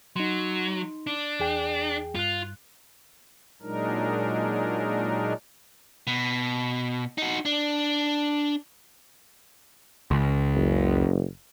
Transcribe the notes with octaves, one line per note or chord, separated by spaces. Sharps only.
F#3 D#4 C6
D4
E2 G#4 G5
G2 F4 F#6
A#2 F#3 G#3 D4 D#4 A#4
B2
D#4 F#4
D4
C#2
F#1